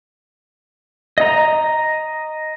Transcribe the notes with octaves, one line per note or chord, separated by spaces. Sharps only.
D#5 A#5